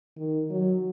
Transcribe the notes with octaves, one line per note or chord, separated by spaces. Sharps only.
D#3
F#3